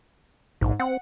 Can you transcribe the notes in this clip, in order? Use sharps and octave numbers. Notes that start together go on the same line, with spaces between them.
A#1 G#2
C4 F#5